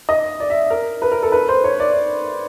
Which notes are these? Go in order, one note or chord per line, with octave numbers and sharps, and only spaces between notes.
D#5
D5
E5
A#4
B4
A#4
A4
B4
C5
C#5
D5